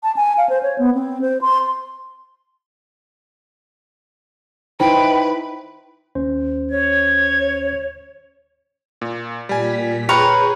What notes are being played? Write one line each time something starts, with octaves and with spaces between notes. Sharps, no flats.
A5
G#5
F5
C5
C#5
B3
C4
C5
C6
D#4 E4 B4 C5 G5
D#2 C#4 C5
C#5 G#6
A#2
A#2 G3 G#5 B6
G#4 B4 C#5 G5 A#5 C#6 F6